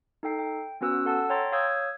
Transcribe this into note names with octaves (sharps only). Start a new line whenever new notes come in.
D#4 A4 G5 C7
G5
B3 C#4 F#4 B4 E6
A4 F#5 A5 E6
C#5 G5 A#5 C6 A6
C#5 F5 D#6 E6 G6 G#6